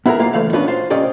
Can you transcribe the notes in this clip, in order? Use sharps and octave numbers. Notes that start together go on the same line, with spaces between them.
B3 E4 F#4 G#4 A#4 A#5
B1 A#3 F4 F5
C#2 E3 A3 A4 F5
A#2 B3 C#4 D4 F#4 B4
F4 C5
C2 A#2 C#4 G4 D5 D#5